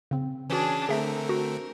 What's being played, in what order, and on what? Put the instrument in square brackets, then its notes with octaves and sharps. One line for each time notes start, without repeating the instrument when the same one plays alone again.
[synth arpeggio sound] C#3 C4
[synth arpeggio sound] E3 F#4 [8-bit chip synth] C#4 [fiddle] D4 G#4
[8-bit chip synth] D3 A3 C4 [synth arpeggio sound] G#4 E5 [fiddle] A#4
[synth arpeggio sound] F#4